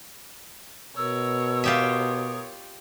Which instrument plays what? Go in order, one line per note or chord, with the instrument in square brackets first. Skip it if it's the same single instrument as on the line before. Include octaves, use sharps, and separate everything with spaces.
[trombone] B2 [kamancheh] A#4 C#5 [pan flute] E6
[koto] F4 G4 E5 [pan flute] D#6